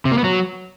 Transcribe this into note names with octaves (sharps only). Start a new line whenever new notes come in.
C3
A#3
B3
F#3